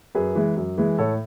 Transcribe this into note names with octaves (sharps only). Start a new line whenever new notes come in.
F#2 G#4 B4
E3 G#3
F#2
E3 G#3
A2 A4 C#5